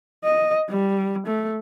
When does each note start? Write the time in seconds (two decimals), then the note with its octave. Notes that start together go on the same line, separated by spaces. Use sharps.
0.24 D#5
0.70 G3
1.27 A3